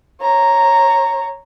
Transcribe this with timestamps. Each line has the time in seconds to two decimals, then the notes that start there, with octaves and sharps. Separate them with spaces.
0.22 C#5 A#5